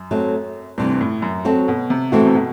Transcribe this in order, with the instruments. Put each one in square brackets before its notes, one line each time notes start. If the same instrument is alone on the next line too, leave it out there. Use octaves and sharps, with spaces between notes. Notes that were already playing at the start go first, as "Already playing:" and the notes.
Already playing: [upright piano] F#2
[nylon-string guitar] F#3 A3 C4
[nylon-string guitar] D2 C3 E3 [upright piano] G2
[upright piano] A2
F#2
[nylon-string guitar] F#3 C4 F#4 A4
[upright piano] B2
C3
[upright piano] A2 [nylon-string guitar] E3 A3 C4 F#4
[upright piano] C3
B2